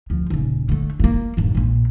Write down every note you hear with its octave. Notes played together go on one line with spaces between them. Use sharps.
D2 F3
D#1 C#3
D3 A3
G2 A#3
D#1 G2
A#1 A#2